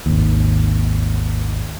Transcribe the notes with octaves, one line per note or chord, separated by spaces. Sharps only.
G#1 D#2